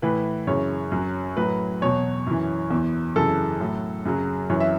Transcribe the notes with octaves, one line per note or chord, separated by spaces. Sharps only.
A2 E3 B4
F#2 C#3 E3 C#5
F#2 F#3
A2 F#3 B4
E2 B2 F#3 C#5
F#2 E3
E2 E3
F#2 C#3 E3 A4
A2 F#3
F#2 C#3 F#3
F#2 E3 C#5
E5